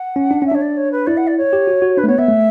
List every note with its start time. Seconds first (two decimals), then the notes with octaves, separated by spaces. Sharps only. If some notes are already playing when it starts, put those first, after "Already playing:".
Already playing: F#5
0.16 C#4
0.31 D4
0.42 C#4 E5
0.52 D4 C#5
0.61 D5
0.77 C#5
0.91 B4
1.07 E4 D5
1.17 F#5
1.27 D5
1.37 C#5
1.53 G4
1.67 F#4
1.82 F#4
1.97 D4 B4
2.04 A3
2.08 B3 C#5
2.18 B3 E5
2.28 A3